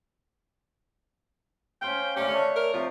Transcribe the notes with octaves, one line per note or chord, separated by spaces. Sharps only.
C#4 C5 F5 G5
D3 A3 C#4 D4 G4
D4 C#5 E5 C#6
A#4
C3 F3